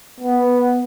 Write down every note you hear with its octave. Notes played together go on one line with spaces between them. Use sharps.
B3